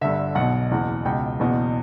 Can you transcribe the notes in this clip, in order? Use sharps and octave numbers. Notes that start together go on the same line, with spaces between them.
G1 G2 D3 E5
B1 F#5
B2
F#1 E2 B2
C#2 B2 G5
F#1 E2 B2